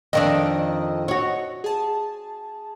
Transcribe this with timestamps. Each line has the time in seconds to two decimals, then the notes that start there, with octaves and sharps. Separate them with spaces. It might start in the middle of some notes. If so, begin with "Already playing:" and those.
0.13 F2 D#3 D4 D#5 E6
1.08 F#4 C#5
1.64 G#4 A5